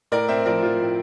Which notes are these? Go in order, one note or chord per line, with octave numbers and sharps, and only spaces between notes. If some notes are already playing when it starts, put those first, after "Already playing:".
A2 A#4 D5
C4 C5 E5
F3 A#4 D5
F3 F4
A2